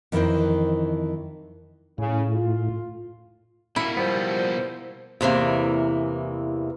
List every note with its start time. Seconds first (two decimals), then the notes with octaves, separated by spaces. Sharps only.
0.12 F2 D#3 E3 E4 A#4 C5
1.98 A2 C#3
2.33 F4
3.76 B2 A#3 E4
3.97 F3 G3 B3 C5
5.21 E2 C3 E3 A#3